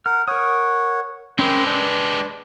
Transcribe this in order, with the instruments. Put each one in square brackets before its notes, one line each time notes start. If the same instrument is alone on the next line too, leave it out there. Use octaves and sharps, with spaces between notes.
[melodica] A#4 F#5 [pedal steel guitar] F6
[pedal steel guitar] A#4 D#6 [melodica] C#5 F#5
[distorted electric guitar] G#3 G4 [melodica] C4 C5 B5 [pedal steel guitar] C#4 A#4
[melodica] D4 [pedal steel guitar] B4